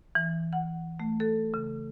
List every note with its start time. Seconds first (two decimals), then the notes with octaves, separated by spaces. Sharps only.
0.15 E3
0.53 F#5
1.00 A3
1.20 A4
1.54 C#3